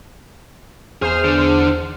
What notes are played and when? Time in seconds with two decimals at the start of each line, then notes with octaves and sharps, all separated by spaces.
1.02 E2 G#4 C5 F6
1.24 D3